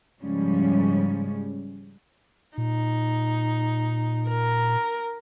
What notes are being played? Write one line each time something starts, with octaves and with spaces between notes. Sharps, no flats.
G#2 C#3 F3 G3 G#3 C#4
A#2 D#4
A#4